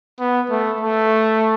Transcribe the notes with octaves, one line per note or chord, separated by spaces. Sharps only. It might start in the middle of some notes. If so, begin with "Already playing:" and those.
B3
A3
A3